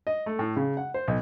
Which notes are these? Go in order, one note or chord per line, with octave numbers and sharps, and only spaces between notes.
D#5
A3
A2
C#3
F#5
C5
B1